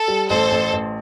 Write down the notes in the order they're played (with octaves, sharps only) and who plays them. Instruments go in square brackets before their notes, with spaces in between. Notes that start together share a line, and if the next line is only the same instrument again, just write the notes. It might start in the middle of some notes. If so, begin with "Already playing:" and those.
Already playing: [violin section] A4
[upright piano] G3
[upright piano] A1 [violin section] A4 C5
[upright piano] A1
A1